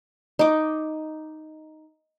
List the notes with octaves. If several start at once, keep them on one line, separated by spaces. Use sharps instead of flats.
D#4 D6